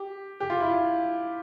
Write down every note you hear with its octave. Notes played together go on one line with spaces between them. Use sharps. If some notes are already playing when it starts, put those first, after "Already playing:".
Already playing: G4
G4
F4
E4
F4